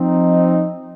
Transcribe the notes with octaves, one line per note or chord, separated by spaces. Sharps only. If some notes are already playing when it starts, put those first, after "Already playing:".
Already playing: F3 C4 D#4